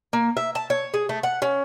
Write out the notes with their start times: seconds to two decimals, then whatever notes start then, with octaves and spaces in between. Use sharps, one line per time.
0.13 A#3
0.37 E5
0.55 A5
0.70 C#5
0.94 G#4
1.09 A3
1.23 F#5
1.42 C#4